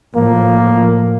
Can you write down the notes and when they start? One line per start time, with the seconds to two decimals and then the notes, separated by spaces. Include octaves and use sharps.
0.16 A2 F3 A#3